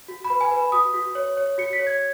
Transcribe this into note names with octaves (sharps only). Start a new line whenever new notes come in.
F#4
B5
B4
G#5
B4
B5
F#4 D#6
F#4
C#5
C#5
F#4 C#7
B6
C#5
G#6